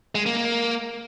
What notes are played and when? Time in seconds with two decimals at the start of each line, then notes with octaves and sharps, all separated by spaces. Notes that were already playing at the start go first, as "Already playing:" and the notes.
0.15 G#3
0.26 A#3
0.37 A#3